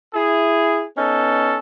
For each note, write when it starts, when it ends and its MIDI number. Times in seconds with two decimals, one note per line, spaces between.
0.13 0.84 64
0.13 0.84 68
0.96 1.59 59
0.96 1.59 61
0.96 1.59 63
0.96 1.59 69